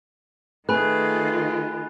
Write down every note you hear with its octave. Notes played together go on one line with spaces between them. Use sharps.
D#3 A3 F4 G#4 B4 G#5 B5 F#6